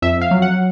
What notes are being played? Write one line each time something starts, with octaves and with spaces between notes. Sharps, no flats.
F2 E5
F5
F#3
F#5